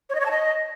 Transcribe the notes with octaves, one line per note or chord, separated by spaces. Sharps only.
C#5
D#5
C#5
A5
D#5